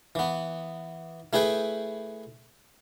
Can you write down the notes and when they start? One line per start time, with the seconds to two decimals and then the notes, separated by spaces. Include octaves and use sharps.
0.15 E3 B3
1.33 A3 E4 G#4 B4 G5